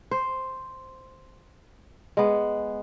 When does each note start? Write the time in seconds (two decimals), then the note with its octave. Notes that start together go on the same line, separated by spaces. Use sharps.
0.11 C5
2.17 G#3 B3